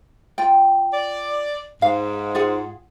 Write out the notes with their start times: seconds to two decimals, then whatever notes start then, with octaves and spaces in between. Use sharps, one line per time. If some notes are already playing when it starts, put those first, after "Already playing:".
0.38 F4 G5
0.94 D5
1.82 G#2 F5
2.35 F4 G#4 F#5